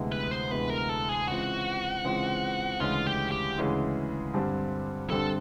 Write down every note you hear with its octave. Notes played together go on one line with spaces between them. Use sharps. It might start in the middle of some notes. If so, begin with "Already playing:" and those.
Already playing: D2 C3 E3 G#3 B3
B4
C5
D2 C3 E3 G#3 B3 B4
A#4
A4
G#4
C#3 E3 G#3 C4 F4 F#4
C#3 E3 G#3 C4 F4
D2 C#3 E3 G#3 C#4 F4
G4
G4
D2 C#3 E3 G#3 C#4
G2 D3 G3 C4
G2 D3 G3 C4 A4